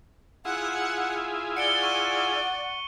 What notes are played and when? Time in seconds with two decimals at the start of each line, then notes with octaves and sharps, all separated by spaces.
0.45 E4 F4 G#4 F#5
1.57 D5 F#5 C#7 D7 G7
1.82 C#6 D#7 G7